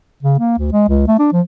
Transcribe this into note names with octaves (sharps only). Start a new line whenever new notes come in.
C#3
A#3
D2
G#3
C#2
A3
D4
F3